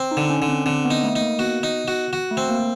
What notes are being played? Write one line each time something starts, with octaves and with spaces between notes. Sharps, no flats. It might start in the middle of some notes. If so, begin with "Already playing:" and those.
Already playing: C4
D#4
D3
C#4
D3
C4
D3 C4
B3
D#4
A3
D#4
A#3
B3 F#4
D#4
F#4
F#4
A3
C4
A#3